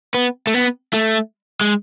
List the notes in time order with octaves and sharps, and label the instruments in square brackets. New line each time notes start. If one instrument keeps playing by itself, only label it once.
[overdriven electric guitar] B3
A3
B3
A3
G#3